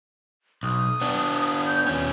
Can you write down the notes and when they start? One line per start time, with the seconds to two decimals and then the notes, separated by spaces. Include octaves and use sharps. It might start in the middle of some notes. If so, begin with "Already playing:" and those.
0.63 B1 D#6
1.01 B3 D4
1.66 G6
1.87 D#2 C#4